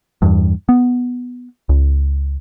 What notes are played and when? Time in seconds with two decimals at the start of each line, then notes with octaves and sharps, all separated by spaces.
0.22 E2 G2
0.69 B3
1.69 C#2